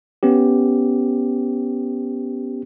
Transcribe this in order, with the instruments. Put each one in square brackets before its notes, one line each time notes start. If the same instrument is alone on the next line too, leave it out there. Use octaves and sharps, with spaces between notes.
[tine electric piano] B3 C#4 G4